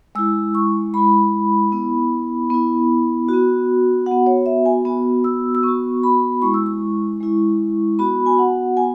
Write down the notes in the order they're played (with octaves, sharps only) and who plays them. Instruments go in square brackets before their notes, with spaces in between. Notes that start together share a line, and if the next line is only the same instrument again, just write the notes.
[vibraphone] G#3 E4 E6
C#6
G#3 E4 B5
B3 E4
B3 E4
B3 F#4
B3 F#4 F#5
C#5
E5
G#5
B3 F#4
E6
E6
B3 F#4 C#6
B5
G#3 E4 C#6
E6
C#6
G#3 E4
B3 F#4 B5
G#5
F#5
B3 G#5